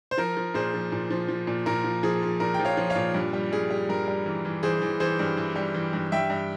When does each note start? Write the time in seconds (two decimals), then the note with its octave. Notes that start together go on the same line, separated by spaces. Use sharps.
0.11 C5
0.18 F3 A#4
0.37 F3
0.54 A#2 G#4 C5
0.74 F3
0.92 A#2
1.11 F3
1.29 F3
1.47 A#2
1.66 A#2 A#4
1.84 F3
2.03 F3 G#4
2.23 F3
2.40 A#2 A#4
2.54 G5
2.60 F3
2.65 C#5 F5
2.77 F3
2.90 C#5 F5
2.96 A#2
3.14 G2
3.33 G3
3.52 G2 G#4
3.70 G3
3.89 G2 A#4
4.08 G3
4.26 E3
4.45 E3
4.63 E3 G#4 C5
4.82 E3
5.00 E3 G#4 C5
5.19 G2
5.37 E3
5.56 G3
5.74 E3
5.93 G2
6.12 G2 E5 G5
6.30 G2